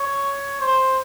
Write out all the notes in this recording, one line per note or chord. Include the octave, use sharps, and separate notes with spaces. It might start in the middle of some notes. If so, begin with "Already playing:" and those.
Already playing: C#5
C5